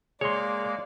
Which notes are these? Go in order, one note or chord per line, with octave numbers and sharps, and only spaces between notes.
G#3 A#3 G#4 C#5 D5 C6